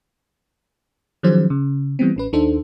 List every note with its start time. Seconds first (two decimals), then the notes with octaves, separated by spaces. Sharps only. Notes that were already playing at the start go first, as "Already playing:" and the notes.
1.23 D#3 F3 F#3 C#4 G#4 C5
1.50 C#3
1.99 E3 G3 B3 C4
2.16 A1 C#4 B4
2.33 D#2 D4 D#4 A4 C5